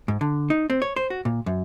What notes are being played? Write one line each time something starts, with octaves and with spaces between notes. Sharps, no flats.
G#2
D3
D#4
C4
C#5
C5
F#4
A#2
F#2